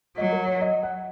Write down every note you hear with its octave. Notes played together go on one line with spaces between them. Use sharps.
F#3 D#5
A#4
C#5
D#5
F#5